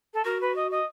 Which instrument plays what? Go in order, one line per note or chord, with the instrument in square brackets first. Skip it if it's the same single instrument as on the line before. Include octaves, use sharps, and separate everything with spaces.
[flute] A4
[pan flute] F#4 [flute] A#4
[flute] B4
D#5
D#5